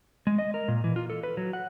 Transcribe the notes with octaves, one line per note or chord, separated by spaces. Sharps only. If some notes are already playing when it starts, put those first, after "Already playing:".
G#3
D#5
A#4
A#2
E3
F4
A4
B4
F#3
F#5